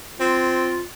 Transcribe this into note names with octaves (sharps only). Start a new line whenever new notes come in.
C4 F4